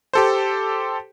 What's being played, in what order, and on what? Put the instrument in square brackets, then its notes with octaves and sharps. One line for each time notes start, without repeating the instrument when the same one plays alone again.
[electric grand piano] G4 A4 C5